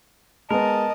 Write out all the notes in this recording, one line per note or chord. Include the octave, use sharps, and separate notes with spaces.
G#3 B3 A#4 D#5 A5